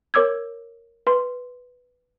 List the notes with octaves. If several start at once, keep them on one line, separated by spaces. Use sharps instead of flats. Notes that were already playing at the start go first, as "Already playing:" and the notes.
A#4 C#5 D6 E6 G#6
B4 C6